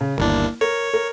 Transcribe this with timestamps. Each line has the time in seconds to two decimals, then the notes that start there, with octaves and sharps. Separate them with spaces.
0.01 C#3
0.18 G1 D#2 A#3 D4 E4
0.61 A#4 C#5
0.94 A#4